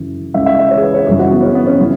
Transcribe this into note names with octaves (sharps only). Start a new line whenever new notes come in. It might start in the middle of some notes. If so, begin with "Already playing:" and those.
Already playing: F#2 C#3 E3
C#2 C#3 E3 E5
E5
E5
C#5
G#4
B4
C#5
F#2 C#3 E3 G#4
F#4
B3
C#4
B3
C#4
C#3 E3